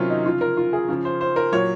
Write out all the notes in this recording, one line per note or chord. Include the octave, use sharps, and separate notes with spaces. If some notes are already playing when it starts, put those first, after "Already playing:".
Already playing: C3 D#3 F#3 C4 C#4 F4
D#4
C#3 F3 F4
A#4
F4
G#4
C#3 F3
C5
C5
A#4
A#2 F#3 C#5